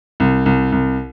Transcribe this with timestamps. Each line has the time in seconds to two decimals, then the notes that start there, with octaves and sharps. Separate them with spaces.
0.20 C2
0.46 C2
0.72 C2